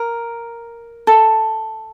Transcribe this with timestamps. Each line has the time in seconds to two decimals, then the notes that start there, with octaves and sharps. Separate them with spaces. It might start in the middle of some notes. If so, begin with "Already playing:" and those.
Already playing: A#4
1.07 A4